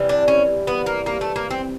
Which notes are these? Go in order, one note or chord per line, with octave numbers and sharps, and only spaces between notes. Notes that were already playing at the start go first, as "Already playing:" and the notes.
Already playing: C3 E3 G3
D4
C#4
B3
A#3
A#3
A3
A#3
C4